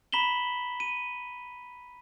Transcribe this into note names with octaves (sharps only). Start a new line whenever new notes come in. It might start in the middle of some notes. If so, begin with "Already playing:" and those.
A#5 B5 B6 E7 F#7 G7
D#7